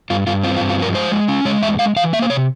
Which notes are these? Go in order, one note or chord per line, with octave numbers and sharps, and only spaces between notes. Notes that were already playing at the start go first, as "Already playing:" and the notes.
G2 F4
G2 F4
C4 F4
F4
G2
F4
F3 A#4
G#3 C5
G#3
C#4
G#3 C#5
E2 E5
G#3 F5
E3 F5
A#3 E5
C5
C3 C#5